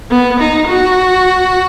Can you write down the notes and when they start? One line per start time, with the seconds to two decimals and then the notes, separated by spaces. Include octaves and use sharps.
0.11 B3
0.40 D#4
0.67 F#4